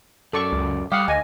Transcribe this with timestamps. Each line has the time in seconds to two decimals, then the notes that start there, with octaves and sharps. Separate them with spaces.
0.33 F#2 A4 D5 C#6
0.52 C#2
0.92 G3 G4 F5 F#5 D#6
1.08 D2 D#5 G#5